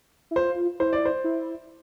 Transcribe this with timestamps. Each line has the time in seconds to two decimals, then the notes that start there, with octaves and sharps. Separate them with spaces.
0.31 E4
0.36 F4 C5
0.80 E4 C5
0.93 D5
1.06 C5
1.24 E4